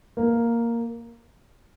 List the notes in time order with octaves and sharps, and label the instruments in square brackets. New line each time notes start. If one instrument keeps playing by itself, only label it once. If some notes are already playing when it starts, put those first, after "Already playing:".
[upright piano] A#3